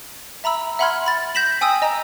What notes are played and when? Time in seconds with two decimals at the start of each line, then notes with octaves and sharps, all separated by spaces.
0.44 E5 A#5 B5 E6
0.79 E5 F#5 B5 C6 F6 G#6
1.06 B5 A6
1.35 G6 A#6 B6 E7 F#7
1.61 G5 G#5 D#6 E6
1.82 D#5 A#5